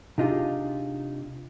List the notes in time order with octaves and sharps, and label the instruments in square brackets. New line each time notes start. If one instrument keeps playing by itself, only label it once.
[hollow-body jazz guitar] C3 D4 D#4 F4 G4 G#4